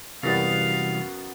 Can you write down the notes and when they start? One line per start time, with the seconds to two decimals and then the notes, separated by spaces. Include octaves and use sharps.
0.23 F#2 C3 E3 G3 B3 F5